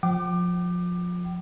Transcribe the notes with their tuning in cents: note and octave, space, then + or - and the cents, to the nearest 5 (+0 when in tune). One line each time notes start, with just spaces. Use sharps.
F3 +25 G5 -40 D6 +25